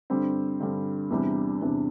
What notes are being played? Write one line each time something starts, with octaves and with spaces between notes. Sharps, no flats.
G2 D3 G3 C4
G2 D3 G3 C4
E2 C3 G3 D4
E2 C3 G3 D4